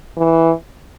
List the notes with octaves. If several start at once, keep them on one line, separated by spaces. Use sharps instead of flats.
E3